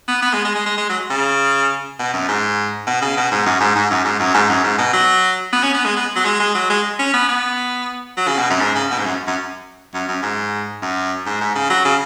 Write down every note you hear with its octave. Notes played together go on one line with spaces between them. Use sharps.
B3
B3
G#3
G#3
G#3
G#3
G#3
F#3
C#3
B2
F#2
G#2
B2
C#3
B2
G#2
F#2
G#2
G#2
F#2
G#2
F#2
G#2
F#2
G#2
B2
F#3
B3
C#4
B3
G#3
B3
F#3
G#3
G#3
F#3
G#3
C#4
B3
B3
F#3
C#3
B2
F#2
G#2
C#3
B2
G#2
F#2
F#2
F#2
F#2
G#2
F#2
G#2
G#2
C#3
F#3
C#3